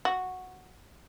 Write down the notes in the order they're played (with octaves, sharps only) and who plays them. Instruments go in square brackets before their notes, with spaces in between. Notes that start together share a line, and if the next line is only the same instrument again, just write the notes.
[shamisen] F#4